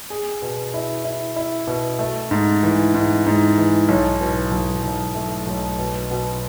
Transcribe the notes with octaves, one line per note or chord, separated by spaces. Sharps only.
G#4
B2
E4
E4
E4
B2
A3
G#2
E3
G#2
G#2
E3
B1
B2
B1
B1
A3
B1
B2
B2